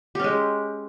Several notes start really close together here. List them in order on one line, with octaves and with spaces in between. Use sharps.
G4 C#4 G#3